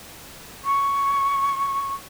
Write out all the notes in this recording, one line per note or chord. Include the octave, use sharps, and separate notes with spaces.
C#6